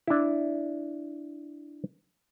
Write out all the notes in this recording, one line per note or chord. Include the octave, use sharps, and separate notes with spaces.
D4 E4